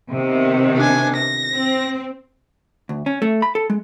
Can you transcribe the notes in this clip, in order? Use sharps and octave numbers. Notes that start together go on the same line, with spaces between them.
C3 D#3 B3
D4 G#5
A#6
C4
D2
C#4
A3
B5
A4
G#3